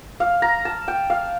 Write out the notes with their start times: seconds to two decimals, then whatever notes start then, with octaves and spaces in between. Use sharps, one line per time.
0.20 F5
0.42 A#5
0.65 A5
0.88 G5
1.10 F5